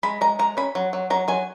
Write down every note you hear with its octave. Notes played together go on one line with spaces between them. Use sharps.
G#3 B5
G#3 A#5
G#3 A#5
C#4 B5
F#3
F#3
F#3 A#5
F#3 G#5